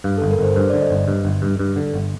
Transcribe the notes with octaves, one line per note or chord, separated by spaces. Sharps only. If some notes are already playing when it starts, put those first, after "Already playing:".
G2 F5
G1 A4
A#4
G1 C5
G2 C5
D3 D5
D#5
G1
G2
G1
G2
G2
D3
G1